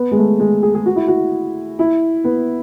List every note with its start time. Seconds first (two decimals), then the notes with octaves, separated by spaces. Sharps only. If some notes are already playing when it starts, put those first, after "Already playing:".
Already playing: B3
0.12 G#3
0.17 A3
0.40 G#3
0.63 G#4
0.75 G#4
0.86 F#4
0.96 E4
1.08 F#4
1.79 E4
2.24 B3